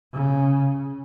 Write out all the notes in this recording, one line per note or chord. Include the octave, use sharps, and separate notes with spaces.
C#3